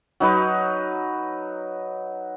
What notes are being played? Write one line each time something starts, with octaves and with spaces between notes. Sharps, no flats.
F#3 D#4 B4